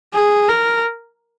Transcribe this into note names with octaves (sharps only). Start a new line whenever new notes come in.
G#4
A#4